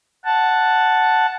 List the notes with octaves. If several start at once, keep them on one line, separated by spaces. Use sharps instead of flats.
F#5 A5